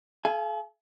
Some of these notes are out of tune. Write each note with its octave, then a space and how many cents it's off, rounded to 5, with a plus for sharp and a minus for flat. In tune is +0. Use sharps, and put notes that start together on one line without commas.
A4 -45 F5 -30 G#5 +0